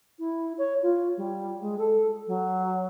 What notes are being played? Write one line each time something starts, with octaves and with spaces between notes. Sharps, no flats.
E4
C#5
F4
G3
G#3
A4
F#3